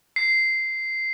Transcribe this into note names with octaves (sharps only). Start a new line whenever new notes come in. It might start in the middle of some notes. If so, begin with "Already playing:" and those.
C7